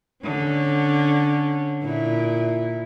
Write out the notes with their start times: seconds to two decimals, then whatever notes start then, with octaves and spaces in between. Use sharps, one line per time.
0.24 D3 C#4
1.83 A#2 E4